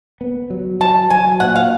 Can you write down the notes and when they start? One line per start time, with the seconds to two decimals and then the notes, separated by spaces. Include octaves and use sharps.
0.21 B3
0.50 F#3
0.80 F#3 A5
1.10 F#3 G#5
1.40 A#2 F#5
1.55 F5